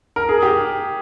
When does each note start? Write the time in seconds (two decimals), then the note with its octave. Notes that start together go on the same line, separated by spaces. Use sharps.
0.16 A#4
0.29 G#4
0.42 G4